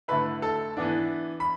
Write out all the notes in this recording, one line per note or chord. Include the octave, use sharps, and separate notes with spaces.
D3 A3 E4 B4 B5
A4 A5
E3 B3 D4
B5